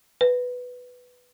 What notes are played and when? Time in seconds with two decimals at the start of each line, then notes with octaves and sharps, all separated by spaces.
0.21 B4